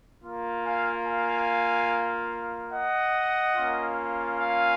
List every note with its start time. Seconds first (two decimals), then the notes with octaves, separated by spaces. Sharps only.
0.21 A#3 F4
0.63 F5 G#5
1.04 F5 G#5
2.71 D#5 F#5
3.55 A#3 C#4 F4
4.39 F5 G#5